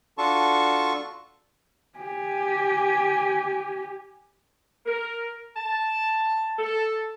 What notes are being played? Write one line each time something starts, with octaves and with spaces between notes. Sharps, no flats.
D4 F4 F#4 A4 A5 C#6
G4 G#5
A#4
A5
A4